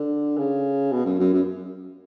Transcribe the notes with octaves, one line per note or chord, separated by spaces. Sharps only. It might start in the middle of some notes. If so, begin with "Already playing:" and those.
Already playing: D3
C#3
B2
F#2
F#2
F#2